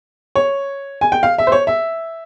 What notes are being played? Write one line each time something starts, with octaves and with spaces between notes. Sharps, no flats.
C#5
G#5
G5
F5
E5
C5
C#5
E5